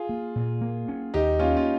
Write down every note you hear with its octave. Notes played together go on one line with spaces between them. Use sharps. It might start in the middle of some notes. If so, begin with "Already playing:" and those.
Already playing: F4 G#4
A#3
A#2
A#3
C#4
D#2 D#4 G4
A#3 C#4 F4
F4